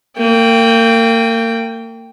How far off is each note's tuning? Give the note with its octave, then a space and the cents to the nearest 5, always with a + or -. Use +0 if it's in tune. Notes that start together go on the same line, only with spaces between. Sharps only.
A#3 -35 G5 +0